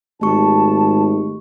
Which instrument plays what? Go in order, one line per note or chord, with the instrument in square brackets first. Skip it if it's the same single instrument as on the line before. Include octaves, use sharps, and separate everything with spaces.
[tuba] G#1 [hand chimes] A3 G4 C#6 [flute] A5